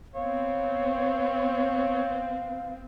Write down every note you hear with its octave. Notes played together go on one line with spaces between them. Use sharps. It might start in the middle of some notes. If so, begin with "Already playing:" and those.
B3 C4 C#5 F5